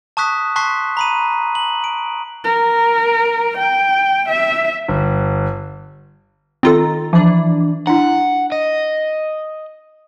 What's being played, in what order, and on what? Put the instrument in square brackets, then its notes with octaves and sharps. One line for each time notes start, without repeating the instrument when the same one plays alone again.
[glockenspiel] A5 C#6 D#6 F#6 B6
A5 C6 C#6 F#6 B6 C7
A#5 B5 D#7
F#7
D7
[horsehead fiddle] A#4
G5
E5
[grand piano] G1
[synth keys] D#3 A#5 A6 [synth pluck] C4 F4 A4
[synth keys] E3 D4 [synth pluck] F3
[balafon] D4 E4 [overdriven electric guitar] F#5
[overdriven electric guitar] D#5